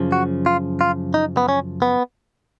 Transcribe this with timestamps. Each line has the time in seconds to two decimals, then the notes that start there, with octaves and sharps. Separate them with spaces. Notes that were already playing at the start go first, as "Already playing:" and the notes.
Already playing: F#2 C#3 F3
0.12 F#4
0.46 F4
0.81 F4
1.14 D#4
1.37 B3
1.49 C#4
1.82 B3